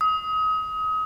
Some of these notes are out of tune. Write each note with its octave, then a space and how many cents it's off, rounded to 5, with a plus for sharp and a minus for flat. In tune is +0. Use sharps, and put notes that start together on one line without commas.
D#6 +30